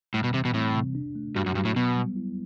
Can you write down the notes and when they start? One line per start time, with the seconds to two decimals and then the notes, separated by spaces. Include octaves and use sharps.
0.14 A2 G3
0.24 B2
0.34 C3 E3
0.45 B2
0.54 A2 C4
0.75 C3
0.95 D4
1.15 A3
1.35 G2 F#4
1.46 F#2
1.55 G2 F#3
1.65 A2
1.76 B2 B3
1.96 G3
2.16 E4